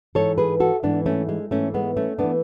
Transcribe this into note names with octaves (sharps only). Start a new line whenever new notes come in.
G#2 E3 A4 C#5
G#4 B4
F#4 A4
G#2 E3 B3 D4
A3 C#4
G#3
G#2 E3 A3 C#4
G#3 B3
A3 C#4
E3 B3 D4